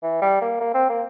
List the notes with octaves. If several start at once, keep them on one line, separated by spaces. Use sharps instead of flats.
E3
G3
A#3
A#3
C4
A#3